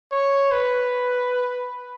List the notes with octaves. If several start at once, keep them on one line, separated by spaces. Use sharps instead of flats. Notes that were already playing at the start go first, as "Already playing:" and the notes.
C#5
B4